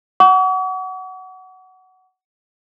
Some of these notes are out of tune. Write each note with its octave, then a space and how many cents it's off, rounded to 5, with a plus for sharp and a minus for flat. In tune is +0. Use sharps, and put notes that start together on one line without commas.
F#5 +10 C#6 +45